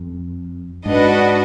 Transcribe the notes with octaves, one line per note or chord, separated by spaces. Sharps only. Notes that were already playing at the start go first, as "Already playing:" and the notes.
Already playing: F2
G#2 D4 F#4 B4 D#5 F#5